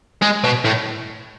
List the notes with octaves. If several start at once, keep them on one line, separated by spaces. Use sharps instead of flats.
G#3
B2
A2